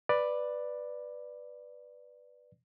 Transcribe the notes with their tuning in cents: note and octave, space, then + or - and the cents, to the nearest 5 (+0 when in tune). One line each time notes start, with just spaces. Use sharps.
B4 +0 D5 +10